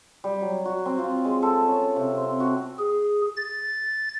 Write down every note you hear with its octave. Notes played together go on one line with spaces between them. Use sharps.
G3
F#3
F#4
C4
F4
G#3
A4
C#4
C3
C4
F#4
G#4
A6